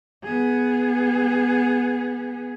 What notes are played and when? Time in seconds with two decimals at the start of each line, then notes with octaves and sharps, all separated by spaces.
0.24 B3 G#4